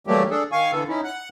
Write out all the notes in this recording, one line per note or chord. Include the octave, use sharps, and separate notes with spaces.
E3 F#3 G3 A3 A#3 G4
D4 G#4 A4
D#3 F5 G#5 C#6
D3 E3 B3 A4
C#4 D#4 E4
F#5 F#6